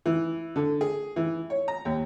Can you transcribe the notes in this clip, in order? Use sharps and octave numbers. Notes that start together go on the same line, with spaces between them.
E3
D3
G#4
E3
C#5
A#5
D#2